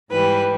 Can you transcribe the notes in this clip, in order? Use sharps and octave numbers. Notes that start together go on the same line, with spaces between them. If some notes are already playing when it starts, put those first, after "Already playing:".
G#2 E3 G3 B4